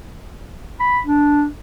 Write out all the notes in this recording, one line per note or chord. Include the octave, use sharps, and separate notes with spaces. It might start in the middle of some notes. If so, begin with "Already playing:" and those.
B5
D4